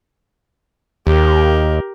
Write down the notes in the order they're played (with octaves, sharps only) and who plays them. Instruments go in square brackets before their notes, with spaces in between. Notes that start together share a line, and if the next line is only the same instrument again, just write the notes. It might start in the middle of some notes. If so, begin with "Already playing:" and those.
[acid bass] D#2 [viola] G4 A#4